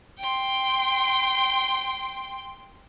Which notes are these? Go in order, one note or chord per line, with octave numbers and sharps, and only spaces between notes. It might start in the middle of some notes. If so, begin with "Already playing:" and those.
G5 C6